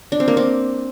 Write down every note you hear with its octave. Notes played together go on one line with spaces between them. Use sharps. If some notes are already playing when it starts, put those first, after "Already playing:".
D4
C4
A#3
C4